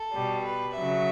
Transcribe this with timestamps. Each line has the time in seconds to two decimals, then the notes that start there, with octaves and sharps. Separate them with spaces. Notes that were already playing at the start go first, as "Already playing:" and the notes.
Already playing: A4
0.14 B2 G3
0.44 B4
0.75 C#3 F#3 E5